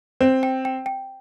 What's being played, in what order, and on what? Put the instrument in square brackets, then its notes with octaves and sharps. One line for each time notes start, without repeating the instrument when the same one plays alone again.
[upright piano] C4 [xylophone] C5
[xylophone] G5
G5
G5